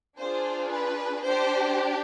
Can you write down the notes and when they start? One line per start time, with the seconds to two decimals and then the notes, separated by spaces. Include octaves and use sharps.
0.19 D4 F4 G#4 C5
0.72 B4
1.25 D4 G4 C5